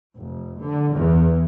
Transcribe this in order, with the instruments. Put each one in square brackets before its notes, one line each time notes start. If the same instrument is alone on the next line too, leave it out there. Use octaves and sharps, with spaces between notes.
[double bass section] F1
D3
E2